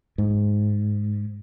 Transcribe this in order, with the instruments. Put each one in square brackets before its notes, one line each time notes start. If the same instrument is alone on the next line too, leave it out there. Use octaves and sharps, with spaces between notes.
[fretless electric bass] G#2